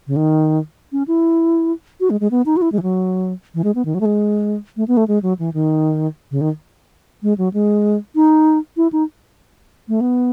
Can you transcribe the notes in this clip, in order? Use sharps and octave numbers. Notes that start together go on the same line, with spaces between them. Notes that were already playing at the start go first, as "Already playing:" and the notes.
C#3
D#3
C#4
E4
F#4
G#3
G#3
B3
D#4
F#4
E4
G#3
E3
F#3
E3
G#3
B3
D#3
F#3
A3
G#3
A3
B3
A3
G#3
F#3
E3
D#3
C#3
D#3
G#3
F#3
G#3
D#4
E4
D#4
A3
B3